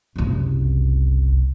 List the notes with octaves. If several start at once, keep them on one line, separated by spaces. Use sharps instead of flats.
F#1 C2